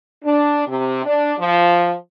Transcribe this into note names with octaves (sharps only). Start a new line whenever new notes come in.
D4
C3
D4
F3